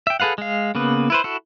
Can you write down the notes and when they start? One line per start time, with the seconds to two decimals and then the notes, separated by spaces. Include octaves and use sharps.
0.07 E5 G5
0.20 G#4 A4 B4 F5 F#5
0.38 G#3 F5
0.75 C#3 A#3 B3 B4
1.10 E4 B4 C5
1.24 E4 F#4 A4